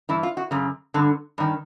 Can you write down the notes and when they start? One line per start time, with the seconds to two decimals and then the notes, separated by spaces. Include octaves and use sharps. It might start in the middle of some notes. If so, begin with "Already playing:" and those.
0.09 G2 E3 E4
0.23 F4
0.37 F#4
0.51 F#2 C#3
0.94 G2 D3
1.38 G2 D#3